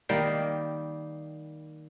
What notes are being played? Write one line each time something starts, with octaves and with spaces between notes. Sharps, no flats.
D#3 G3 A#3